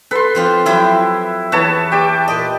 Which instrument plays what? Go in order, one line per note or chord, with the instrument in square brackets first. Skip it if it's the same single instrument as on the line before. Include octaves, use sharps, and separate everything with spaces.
[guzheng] A4 [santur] B4 C6
[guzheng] F3 C4 F4
[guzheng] F3 F#3 G4 [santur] E4
[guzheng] E2 [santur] B4 C#5 A5
[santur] G4 D5 D6
[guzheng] A#2 D#5